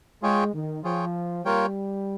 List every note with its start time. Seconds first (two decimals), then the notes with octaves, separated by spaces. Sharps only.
0.23 G#3 F4 G#4 C#5 G5
0.53 D#3
0.84 F3 F4 G#4 C#5 G5
1.45 G3 A#3 F4 A#4 C#5 G5